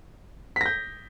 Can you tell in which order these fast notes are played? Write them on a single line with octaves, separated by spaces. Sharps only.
B6 A#6 G6